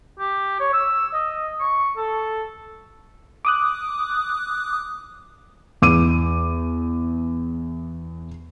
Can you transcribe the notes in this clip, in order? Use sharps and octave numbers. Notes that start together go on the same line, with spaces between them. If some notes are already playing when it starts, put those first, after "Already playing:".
G4
C#5
E6
D#5
C#6
A4
D6 D#6 F#6
E2 D6 D#7